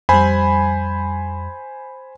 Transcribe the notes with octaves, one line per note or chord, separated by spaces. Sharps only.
F2 G3 C5 G#5 B5